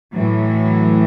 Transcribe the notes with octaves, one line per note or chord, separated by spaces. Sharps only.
A2 E3 F#3